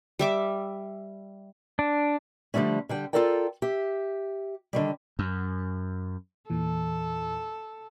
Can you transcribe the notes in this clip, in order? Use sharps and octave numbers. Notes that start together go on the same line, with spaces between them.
G3 E5 D6
D4
D3 F3 G3 A3 C#4
D3 G3 G5
F4 G4 A4 A#4 D5 G5
G4 E5
D3 D#3 G3
F#2
E2 A#2 E3 A4